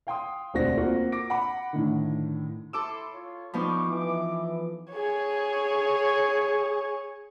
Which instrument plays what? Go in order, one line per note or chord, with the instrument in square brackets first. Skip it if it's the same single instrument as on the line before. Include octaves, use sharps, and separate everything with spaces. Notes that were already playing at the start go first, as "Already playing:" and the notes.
[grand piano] F5 G5 C6 D#6
E1 D2 C4 F#4 D5 A#6
A#3 C4 F4 F#4
D6 A#6 D7
F#5 B5 D6
A2 D3 D#3
[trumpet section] E4 C6 [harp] A4 D6 E6
[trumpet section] F4 C#5
[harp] F3 B3 D#4 [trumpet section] G3 C#6 D6
[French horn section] E3 [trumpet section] D6
[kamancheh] G#4 C#5